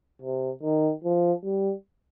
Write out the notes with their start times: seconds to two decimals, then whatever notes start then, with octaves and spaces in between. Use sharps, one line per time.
0.22 C3
0.63 D#3
1.04 F3
1.44 G3